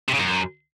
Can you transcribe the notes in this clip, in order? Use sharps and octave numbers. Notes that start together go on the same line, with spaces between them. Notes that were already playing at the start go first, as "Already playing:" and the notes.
C3
C#3
F#2